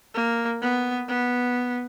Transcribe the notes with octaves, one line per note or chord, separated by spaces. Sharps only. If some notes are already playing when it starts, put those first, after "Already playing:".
A#3
B3
B3